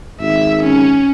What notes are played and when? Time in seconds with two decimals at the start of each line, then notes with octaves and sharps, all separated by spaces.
0.20 G#1 E5
0.63 C#4